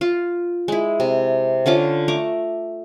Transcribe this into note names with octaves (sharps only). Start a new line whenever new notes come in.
F4
G#3 E4
C3
D3 C#4 F4 D6
A3 A#5 C#6 D6